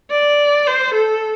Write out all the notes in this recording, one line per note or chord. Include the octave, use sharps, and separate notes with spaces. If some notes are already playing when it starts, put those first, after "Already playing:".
D5
C5
A4